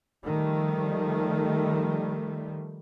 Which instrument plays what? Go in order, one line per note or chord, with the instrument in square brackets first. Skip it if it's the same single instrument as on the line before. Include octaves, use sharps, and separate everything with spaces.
[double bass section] D#3 F3 G3 A3